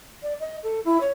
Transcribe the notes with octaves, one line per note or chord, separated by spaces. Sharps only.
D5
D#5
A4
E4
C#5